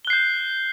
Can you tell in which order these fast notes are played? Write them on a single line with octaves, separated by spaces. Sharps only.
G7 F#6 C7 G6